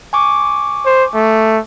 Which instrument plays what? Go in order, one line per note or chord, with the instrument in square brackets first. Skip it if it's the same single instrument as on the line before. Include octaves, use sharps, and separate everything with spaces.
[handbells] G#5 C#6 D6
[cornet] C5
A3